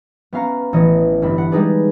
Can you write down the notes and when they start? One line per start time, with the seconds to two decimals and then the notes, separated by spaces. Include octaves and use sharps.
0.33 B3 C#4 F5 A#5
0.73 A1 E3 C#5 D#5
1.22 G1 G2 D4 B5
1.38 F#5
1.52 G3 G#3 D#4 G#4 B4 D5